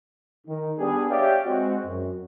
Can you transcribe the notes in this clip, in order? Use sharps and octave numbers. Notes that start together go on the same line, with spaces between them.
D#3
G3 B3 D4 G4 G#4
G4 C#5 D5 E5 F5 G5
G#3 C4 F#4
F#2